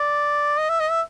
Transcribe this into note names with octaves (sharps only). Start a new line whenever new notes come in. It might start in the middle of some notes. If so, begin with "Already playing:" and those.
Already playing: D5
D#5
E5
D#5
E5